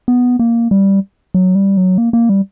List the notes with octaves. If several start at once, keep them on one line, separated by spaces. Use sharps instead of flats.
B3
A#3
G3
F#3
G3
F#3
A#3
A#3
G3